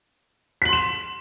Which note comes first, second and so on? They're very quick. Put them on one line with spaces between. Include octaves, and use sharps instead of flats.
B6 F#7 C6 E7